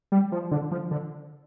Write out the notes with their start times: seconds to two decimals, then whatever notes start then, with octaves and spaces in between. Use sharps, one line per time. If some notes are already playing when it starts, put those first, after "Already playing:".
0.12 G3
0.32 F3
0.51 D3
0.71 F3
0.91 D3